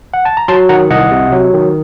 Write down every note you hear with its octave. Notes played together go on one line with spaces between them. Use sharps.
F#5
A5
A#5
F#3 A5 C6
D#3 F#5 A#5
C2 D#5 F#5
C3
F#3
D#3